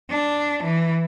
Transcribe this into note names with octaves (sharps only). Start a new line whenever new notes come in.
D4
E3